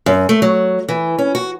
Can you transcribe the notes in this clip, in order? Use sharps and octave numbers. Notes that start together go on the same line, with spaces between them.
F#2
A3
F#3
E3
C#4
F#4